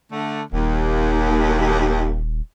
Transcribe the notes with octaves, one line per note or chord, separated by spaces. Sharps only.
D3 A3
D#1 D#2